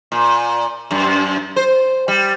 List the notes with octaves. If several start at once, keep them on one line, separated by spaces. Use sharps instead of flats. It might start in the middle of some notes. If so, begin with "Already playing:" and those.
A#2
F#2
C5
G3